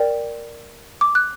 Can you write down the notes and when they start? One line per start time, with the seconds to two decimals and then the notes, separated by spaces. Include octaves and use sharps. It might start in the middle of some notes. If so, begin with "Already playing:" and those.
Already playing: A#4 D5 G5
1.01 D6
1.15 F#6